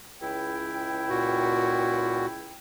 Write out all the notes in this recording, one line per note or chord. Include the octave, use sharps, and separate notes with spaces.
C#2 E4 G5
A#2 F#4